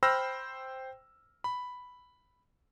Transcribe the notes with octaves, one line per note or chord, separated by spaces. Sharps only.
C5 G5 B5 E6 F6 A#6
B5